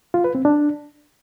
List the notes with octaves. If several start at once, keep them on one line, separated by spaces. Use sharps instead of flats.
F4
B4
C4
D4